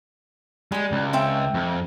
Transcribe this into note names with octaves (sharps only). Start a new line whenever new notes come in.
G3 G#3 G4
C#2
C4 E5 G5
F2